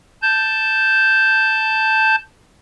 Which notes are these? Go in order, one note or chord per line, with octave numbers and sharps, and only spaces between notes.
A5 G6